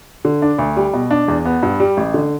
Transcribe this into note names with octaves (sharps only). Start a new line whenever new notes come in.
D3
D4
D2
G3
B2
D4
E2
B3
G2
G3
A1
D3